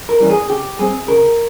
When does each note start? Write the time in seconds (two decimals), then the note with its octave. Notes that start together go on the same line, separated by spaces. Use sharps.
0.09 A#4
0.20 E3 G3 C#4
0.30 G#4
0.49 C#3 G4
0.79 G3 C4 G#4
1.08 C#3 A#4